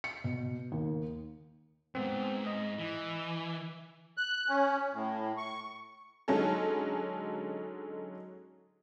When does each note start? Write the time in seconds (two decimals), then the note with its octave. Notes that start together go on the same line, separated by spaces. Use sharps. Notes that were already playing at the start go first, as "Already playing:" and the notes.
0.04 C#7
0.24 B2
0.72 D#2
1.95 F2 G#2 B3 C4
2.46 D#5
2.79 E3
4.17 F#6
4.49 C#4
4.93 A2
5.37 C#6
6.28 D3 F#3 G#3 C#4 D#4 A4